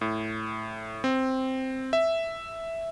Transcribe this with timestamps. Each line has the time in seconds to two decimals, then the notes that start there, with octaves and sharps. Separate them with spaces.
0.01 A2
1.04 C4
1.93 E5